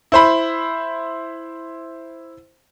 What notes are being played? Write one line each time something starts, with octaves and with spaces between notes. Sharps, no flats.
E4 C5 B5